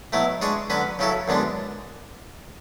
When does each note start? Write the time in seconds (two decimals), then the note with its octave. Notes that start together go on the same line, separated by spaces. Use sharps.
0.12 B2 F#3 A3 E4
0.42 G#3 D4 G#4 C#5
0.70 D3 F#3 C#4 F#4 B4
0.99 C#3 F#3 C#4 E4 A4
1.28 F#2 D3 G#3 B3 D4